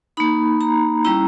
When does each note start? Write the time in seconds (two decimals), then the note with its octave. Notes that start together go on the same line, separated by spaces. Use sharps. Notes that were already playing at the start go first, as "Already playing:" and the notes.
0.17 A#3 D#4 B5
0.61 A#5
1.05 G3 C#4 E4 A#5